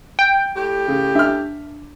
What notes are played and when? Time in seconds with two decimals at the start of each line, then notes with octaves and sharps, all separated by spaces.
0.19 G5
0.56 A2 G4
0.88 C#3
1.15 D4 E5 F6